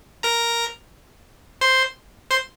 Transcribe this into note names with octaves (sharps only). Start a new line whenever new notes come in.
A#4 A#5
C5 C6
C5 C6